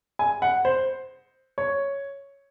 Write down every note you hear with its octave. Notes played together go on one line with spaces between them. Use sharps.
G#5
F#5
C5
C#5